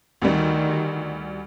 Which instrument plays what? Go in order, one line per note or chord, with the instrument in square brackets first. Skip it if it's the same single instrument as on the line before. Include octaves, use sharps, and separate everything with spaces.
[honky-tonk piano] D2 G3 [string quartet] D#3